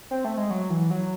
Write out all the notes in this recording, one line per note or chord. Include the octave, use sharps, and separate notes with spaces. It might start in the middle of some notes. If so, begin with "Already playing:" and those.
C4
A3
G#3
F#3
E3
F#3